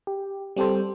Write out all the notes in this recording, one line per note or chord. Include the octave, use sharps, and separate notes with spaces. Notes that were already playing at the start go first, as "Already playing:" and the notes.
G4
G3 C4 G4 A4 C5